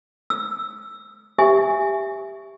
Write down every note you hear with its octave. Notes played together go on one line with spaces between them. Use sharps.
E6
G4 E5 G#5